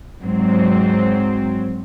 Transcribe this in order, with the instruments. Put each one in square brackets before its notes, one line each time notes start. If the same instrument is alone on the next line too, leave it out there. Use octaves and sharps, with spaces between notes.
[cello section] G#2 F#3 C4